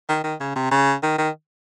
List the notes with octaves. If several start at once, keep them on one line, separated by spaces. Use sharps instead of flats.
D#3
D#3
C#3
C3
C#3
D#3
D#3